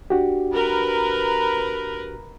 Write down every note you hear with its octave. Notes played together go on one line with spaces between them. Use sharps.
D4 F#4 G4
A#4 B4